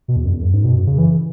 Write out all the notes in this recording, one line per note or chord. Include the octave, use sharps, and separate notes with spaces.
B2
E2
F#2
E2
F#2
G#2
B2
F#2
C#3
E3